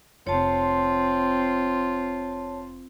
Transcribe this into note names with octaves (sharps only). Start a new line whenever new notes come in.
F1 C4 F4 C#5 A5